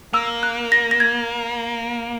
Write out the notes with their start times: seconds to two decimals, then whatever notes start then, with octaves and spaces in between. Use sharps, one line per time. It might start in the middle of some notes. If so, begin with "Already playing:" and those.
0.13 A#3 E6
0.43 F#6
0.72 A#6
0.91 A#6
1.00 G#6